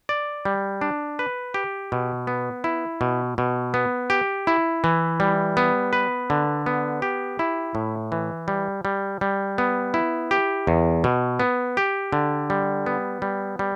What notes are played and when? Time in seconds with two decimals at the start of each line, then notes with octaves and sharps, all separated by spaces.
0.09 D5
0.45 G3
0.81 D4
1.19 B4
1.54 G4
1.92 B2
2.27 B3
2.64 E4
3.01 B2
3.38 B2
3.74 B3
4.10 G4
4.47 E4
4.84 E3
5.20 G3
5.57 B3
5.93 B4
6.30 D3
6.66 B3
7.02 G4
7.39 E4
7.75 A2
8.12 E3
8.48 G3
8.85 G3
9.21 G3
9.58 B3
9.94 E4
10.31 G4
10.67 E2
11.04 B2
11.40 B3
11.77 G4
12.13 D3
12.50 G3
12.86 B3
13.22 G3
13.59 G3